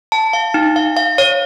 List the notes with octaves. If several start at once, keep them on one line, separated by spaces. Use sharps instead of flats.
A5
F5
D#4
F5
F5
C#5